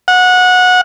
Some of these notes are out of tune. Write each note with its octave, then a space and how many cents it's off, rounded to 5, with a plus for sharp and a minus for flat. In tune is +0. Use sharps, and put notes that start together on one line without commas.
F#5 -20